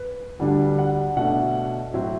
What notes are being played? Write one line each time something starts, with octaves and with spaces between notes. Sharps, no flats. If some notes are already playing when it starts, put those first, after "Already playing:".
Already playing: B4
D2 D3 G3 D4
F#5
B2 A3 D4 F#5
A2 F#3 C4 E5